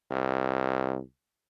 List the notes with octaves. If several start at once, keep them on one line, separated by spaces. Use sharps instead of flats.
C2